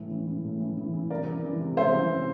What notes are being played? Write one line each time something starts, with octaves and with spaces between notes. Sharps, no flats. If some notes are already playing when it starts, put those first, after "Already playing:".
Already playing: A2 E3
E3
E3
A2
E3
E3
E3
C3 A#4 D5
E3
E3
C3
C3 C5 E5
E3
C3